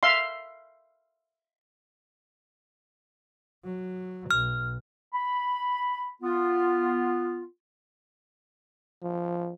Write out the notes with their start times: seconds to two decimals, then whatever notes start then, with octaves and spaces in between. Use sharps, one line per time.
0.03 E5 F5 C6
3.64 F#3
4.31 B1 F6
5.13 B5
6.22 B3 F4
9.02 F3